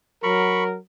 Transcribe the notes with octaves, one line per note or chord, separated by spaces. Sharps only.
F#3 A#4 B5 C#6